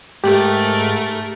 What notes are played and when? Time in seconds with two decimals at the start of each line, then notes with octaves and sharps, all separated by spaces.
0.24 G#2 A3 G4 A#4